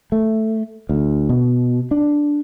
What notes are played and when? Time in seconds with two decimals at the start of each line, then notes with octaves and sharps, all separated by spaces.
0.12 A3
0.89 D2
1.29 B2
1.91 D4